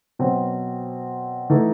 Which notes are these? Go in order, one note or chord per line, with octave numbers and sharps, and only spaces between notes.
B2 F#3 C4
E3 A3 D#4